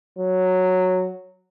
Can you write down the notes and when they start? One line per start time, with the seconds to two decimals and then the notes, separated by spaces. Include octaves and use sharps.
0.19 F#3